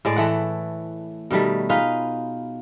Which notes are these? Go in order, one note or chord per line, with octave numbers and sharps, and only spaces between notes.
A2 G#3 D5
E3 A3 F#5
B2 D#3 G3 A3
D#4 F4 G#4 B4